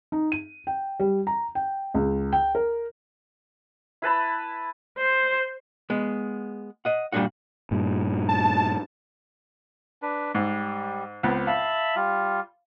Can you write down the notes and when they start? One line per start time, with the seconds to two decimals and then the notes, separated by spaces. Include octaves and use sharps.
0.12 D#4
0.32 D#7
0.67 G5
1.00 G3
1.27 A#5
1.55 G5
1.94 C#2
2.33 G5
2.55 A#4
4.02 E4 B4 A5 B5
4.98 C5
5.90 G#3 B3
6.85 D#5 F#5
7.12 A#2 G3 C#4 D4 F#4 F#5
7.71 G2 A#2
8.29 A5
10.02 D4 B4
10.35 G#2 G3
11.23 C#2 B3 C4
11.47 E5 F5 A5 B5
11.96 G3 F4